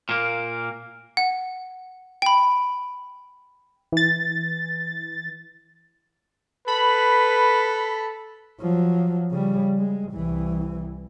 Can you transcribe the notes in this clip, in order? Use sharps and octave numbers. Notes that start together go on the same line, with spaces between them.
A#2 A#3
F#5
G5 B5
E3 A6
A4 B4 B5
F3 F#3
C#3 G3
G#3
C2 E3